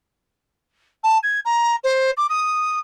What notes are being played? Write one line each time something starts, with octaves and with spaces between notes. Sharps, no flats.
A5
G#6
A#5
C5
D6
D#6